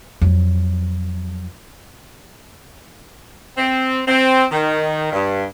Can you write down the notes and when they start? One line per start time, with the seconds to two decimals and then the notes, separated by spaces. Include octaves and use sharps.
0.22 F2 F#3
3.57 C4
4.08 C4
4.51 D#3
5.12 G2